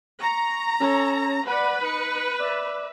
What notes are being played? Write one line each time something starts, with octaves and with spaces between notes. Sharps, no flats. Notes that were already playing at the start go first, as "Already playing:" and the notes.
A#5 C#6
C#4 A4 C#5
B4 D5 F#5 B5
D#4 C#7
D5 E5